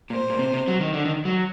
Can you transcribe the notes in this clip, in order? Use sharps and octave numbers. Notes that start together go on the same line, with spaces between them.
A#2 C5
A#2
C3
C3
F#3
D#3
D3
D#3
F#3